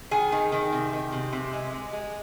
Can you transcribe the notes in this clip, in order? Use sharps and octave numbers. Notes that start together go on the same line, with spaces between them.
D#3 G#4
D#3
D#3
C3
D#3
C3
C3
G#3
G#3
G#3